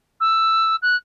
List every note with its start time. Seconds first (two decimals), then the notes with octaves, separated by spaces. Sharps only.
0.20 E6
0.82 F#6